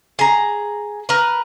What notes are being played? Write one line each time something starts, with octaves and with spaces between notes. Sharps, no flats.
G#4 A#5
A#4 B4